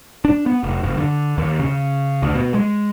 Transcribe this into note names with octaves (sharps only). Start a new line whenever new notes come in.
D4
B3
F1
F#1
D3
D#2
C#3
D2
B2
G#3